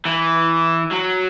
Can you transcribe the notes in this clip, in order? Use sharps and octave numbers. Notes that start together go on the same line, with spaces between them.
E3
F#3